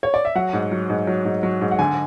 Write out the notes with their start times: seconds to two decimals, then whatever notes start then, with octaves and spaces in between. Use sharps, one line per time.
0.03 C#5
0.14 D5
0.25 E5
0.35 F#3 F#5
0.53 G#2
0.72 F#3
0.90 G#2
1.07 F#3
1.25 G#2
1.43 F#3
1.61 G#2
1.71 F#5
1.79 D3 G#5